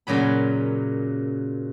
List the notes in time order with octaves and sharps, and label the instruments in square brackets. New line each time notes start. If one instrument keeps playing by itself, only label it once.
[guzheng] F#2 A#2 C#3 F#3 B5